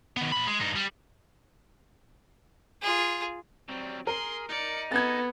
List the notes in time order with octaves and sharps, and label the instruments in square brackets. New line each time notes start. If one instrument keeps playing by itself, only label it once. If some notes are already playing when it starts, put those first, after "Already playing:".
[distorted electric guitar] D#3 B3
A#2 B5
G#3
G2 D#4
G3
[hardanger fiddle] F4 G#4
[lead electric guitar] F#3 G3 [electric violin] C4
[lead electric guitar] G#4 [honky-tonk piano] A#4 [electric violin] C6
[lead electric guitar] D#4 [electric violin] D5 C#7
[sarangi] B3 [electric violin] A4 [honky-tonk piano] G#6 A6